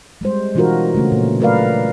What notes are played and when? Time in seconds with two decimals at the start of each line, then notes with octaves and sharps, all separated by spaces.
0.21 G3 G#3 C5
0.55 B2 E3 D4 F4 F#4 A#4
0.95 C#3 A3 C#4
1.12 A#2
1.40 F#3 A3 A#4 B4 D5 F5